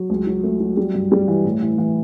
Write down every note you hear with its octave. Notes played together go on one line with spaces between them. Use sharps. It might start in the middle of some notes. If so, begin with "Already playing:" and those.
Already playing: F#3
C#2
F#3
A3
F#3
G3
G2
G3
E3
A2
E3
E3